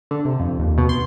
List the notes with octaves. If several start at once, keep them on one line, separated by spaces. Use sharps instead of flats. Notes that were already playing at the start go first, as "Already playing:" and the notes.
D3
C3
F2
D#2
B2
C6